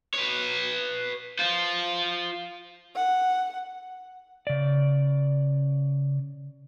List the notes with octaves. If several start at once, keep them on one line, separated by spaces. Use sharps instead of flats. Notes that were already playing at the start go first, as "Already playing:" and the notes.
B4 C#5
F4 C5
F#5
C#3 D5